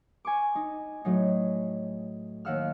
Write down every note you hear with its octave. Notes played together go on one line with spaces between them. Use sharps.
G#5 C#6 D6
D#4
A2 F#3 D#4
D#2 F5 F#5 E6 F6